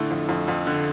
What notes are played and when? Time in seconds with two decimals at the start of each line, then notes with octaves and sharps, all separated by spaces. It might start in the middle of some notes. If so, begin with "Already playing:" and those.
Already playing: A2 D3 A3
0.11 F2
0.29 F2
0.48 F2
0.67 D3